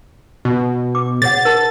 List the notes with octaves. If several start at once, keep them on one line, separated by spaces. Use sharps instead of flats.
B2
D6
G#4 C#5 F#5 A6
A#4 A5